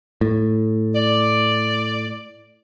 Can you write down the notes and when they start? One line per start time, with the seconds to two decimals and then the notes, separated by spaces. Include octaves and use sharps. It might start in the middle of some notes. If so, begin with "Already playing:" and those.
0.21 A2
0.94 D5